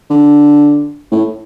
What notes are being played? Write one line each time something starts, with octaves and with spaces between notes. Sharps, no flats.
D3
A2